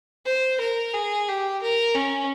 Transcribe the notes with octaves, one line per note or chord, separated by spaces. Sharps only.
C5
A#4
G#4
G4
A#4
C#4